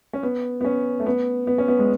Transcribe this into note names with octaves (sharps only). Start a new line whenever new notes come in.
C#4
B3
B3
C#4
A3
B3
B3
C#4
B3
G#3